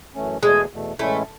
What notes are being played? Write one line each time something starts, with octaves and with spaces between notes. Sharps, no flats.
F#2 E3 A3 C#4
E2 B2 G#3 A3
E2 B2 A3
A2 E3 G#3 A3 C#4 E4